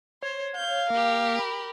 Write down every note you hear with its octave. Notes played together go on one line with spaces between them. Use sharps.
C5 C#5
F5 G6
A#3 G4 A#4
B5